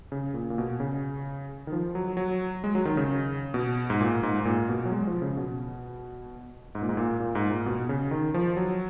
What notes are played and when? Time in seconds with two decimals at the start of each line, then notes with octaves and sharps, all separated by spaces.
0.12 C#3
0.34 A#2
0.50 A#2
0.58 B2
0.80 C#3
1.67 D#3
1.72 F3
1.95 F#3
2.17 F#3
2.64 G#3
2.75 F#3
2.85 D#3
2.97 C#3
3.54 B2
3.90 G#2
4.01 A#2
4.23 G#2
4.41 G#2
4.45 A#2
4.69 B2
4.85 F#3
4.91 G#3
5.07 F3
5.22 C#3
5.37 B2
6.75 G#2
6.82 A#2
6.89 G#2
6.97 A#2
7.20 A#2
7.35 G#2
7.50 A#2
7.66 B2
7.89 C#3
8.11 D#3
8.34 F3
8.57 F#3